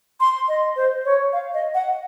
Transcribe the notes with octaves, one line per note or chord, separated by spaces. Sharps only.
C6
D#5
C5
C#5
F5
D#5
F#5